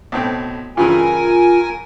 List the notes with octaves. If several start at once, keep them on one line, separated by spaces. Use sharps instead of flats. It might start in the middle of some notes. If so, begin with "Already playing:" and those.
B1 A2 C4
G2 C#3 E3 F4 A#4 G#5